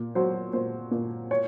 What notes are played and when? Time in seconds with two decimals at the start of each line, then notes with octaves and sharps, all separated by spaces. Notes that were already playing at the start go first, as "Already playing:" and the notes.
Already playing: A#2
0.15 F#3 C5
0.53 A#2 C5
0.92 A#2
1.31 C#5